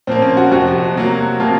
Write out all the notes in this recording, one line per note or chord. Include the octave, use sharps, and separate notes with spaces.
A#2 F3 A#3 C4
C#4
F#4
F2 C3 F3 F#4
C3 F#3 A#3
C3 F3 A#3 F4